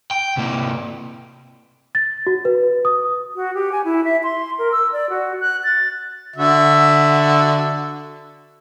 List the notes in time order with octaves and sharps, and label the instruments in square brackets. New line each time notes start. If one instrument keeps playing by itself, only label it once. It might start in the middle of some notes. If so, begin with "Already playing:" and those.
[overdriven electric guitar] G5
C3 A#3
[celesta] A6
F#4
B4
D#6
[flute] F#4
G4
G#5
E4
E5
C6
A#4
E6
D5
F#4
F#6
A6
[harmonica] D3 F#4 E5